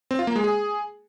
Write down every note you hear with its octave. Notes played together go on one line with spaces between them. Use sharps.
C4
F4
A#3
G#3
G#4